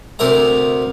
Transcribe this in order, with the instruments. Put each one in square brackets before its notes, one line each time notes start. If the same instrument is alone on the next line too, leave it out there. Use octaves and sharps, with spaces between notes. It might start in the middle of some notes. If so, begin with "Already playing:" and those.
[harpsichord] D2 C3 A#4 E5 A#5